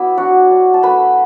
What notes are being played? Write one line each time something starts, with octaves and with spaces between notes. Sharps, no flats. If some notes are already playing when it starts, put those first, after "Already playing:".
Already playing: F#3 B3 E4 B4 D5 E5
D4 F#4 F#5
D4
A5
A3 B4 B5